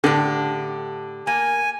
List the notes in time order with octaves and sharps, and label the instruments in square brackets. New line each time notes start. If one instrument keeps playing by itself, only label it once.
[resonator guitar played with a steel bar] A2 G4 [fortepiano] D3
[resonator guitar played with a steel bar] A#3 [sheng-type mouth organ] G#5